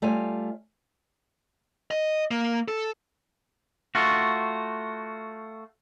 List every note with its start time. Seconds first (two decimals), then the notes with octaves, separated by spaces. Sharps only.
0.02 G3 A3 F4 C#5 G#5
1.91 D#5
2.31 A#3
2.68 A4
3.95 A3 F4 F#4